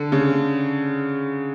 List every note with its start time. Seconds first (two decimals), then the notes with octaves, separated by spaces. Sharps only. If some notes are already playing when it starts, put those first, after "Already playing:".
Already playing: D3
0.12 C#3